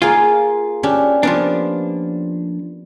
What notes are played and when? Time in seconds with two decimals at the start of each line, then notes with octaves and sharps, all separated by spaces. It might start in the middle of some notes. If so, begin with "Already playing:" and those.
0.02 A#3 F4 G#4
0.83 C#4 D4 G4
1.23 F3 A#3 B3 D4